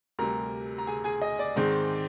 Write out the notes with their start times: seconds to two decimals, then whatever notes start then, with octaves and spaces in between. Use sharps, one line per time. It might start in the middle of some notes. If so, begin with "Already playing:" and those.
0.19 D2 C3 G3 A#4 A#5
0.78 A#5
0.87 G#4 G#5
1.04 G#4 G#5
1.22 D#5
1.39 D5
1.56 G#2 D#3 G#3 C4